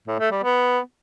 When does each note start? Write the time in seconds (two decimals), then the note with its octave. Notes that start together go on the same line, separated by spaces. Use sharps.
0.07 A2
0.19 A3
0.31 G3
0.43 B3